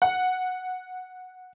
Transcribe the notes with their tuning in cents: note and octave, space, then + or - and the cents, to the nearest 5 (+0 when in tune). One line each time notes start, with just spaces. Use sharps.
F#5 -5